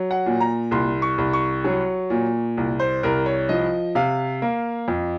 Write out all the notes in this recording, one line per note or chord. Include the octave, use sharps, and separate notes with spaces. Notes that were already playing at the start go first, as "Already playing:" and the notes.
Already playing: F#3
F#5
A#2
A#5
C2 C6
C#6
C2
C#6
F#3
A#2
C2
C5
C2 A#4
C#5
F3 D#5
C3 F5
A#3
F2